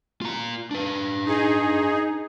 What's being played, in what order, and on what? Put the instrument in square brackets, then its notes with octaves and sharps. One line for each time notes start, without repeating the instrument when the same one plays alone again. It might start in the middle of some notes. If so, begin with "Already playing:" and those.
[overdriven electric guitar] F4 A#5
D4 B4
[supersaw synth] D#4 G#4